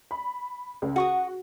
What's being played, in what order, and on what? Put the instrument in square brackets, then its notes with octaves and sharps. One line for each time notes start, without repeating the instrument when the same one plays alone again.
[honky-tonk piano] B5
C#2
[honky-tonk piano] F#4 [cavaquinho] F#5 C#6 D#6